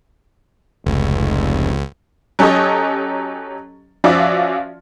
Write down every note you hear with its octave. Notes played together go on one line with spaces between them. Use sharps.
F1 C#2
F#3 C#4 G4 A4 C#5 D#5
F3 C#4 F4 F#4 D5 E5